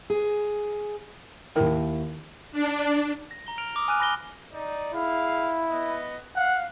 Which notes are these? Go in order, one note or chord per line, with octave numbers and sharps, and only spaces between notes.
G#4
D#2 D#3 E4 A#4 G5
D4
A#6
A#5 G7
F6 D7 F7
D6 D#6
G#5 F6 F#6 D#7
B5 A#6 G7
D#4 D5
E4 G#4 F5
B3 D#5
F5 F#5